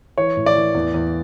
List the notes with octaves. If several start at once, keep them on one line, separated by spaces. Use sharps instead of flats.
E3 C#5
A2
D5
E3
E2
E2